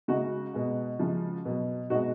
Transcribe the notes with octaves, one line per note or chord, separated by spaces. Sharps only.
C#3 G#3 D#4 F#4
B2 G#3
C#3 F3 G#3
B2 F#3
B2 G#3 D#4 F#4